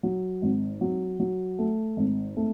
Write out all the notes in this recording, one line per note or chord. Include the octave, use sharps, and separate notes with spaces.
F#3
G#1
F#3
F#3
A3
G#1
A3